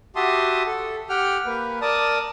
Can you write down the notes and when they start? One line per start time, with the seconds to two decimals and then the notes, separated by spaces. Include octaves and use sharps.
0.16 F#4 G4 E5 A5 C6 D#6
0.66 A4
1.09 G4 F#5 G5 F6
1.46 A#3 B4
1.81 A#4 D5 A5 D#6